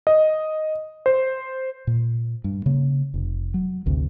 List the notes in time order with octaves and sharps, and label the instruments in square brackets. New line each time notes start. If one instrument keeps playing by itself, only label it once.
[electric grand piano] D#5
C5
[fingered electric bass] A#2
G2
C#3 A#3
F1
F#3
G#1 D2 C3